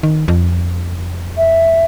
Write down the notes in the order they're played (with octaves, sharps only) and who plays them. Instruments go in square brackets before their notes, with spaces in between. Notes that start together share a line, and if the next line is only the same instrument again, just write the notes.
[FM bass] D#3
F2
[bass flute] E5